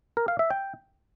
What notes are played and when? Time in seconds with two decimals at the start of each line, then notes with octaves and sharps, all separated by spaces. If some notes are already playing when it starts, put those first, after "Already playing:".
0.17 A#4
0.28 F5
0.39 E5
0.50 G5